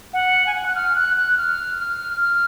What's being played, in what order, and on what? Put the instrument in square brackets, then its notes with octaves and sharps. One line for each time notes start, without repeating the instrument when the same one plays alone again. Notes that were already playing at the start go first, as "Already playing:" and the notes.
[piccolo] F#5
G#5
F#5
F#6
F6
F#6
F#6
F6
F6
F6